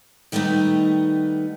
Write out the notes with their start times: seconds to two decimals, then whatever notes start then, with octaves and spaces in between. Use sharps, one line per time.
0.32 D#3 G3 A3 B3 D#4